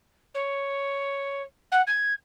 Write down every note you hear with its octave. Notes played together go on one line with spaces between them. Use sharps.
C#5
F#5
G#6